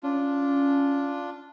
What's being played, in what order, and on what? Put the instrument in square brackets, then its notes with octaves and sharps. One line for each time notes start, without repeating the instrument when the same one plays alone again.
[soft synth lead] C#4 [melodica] D4 F4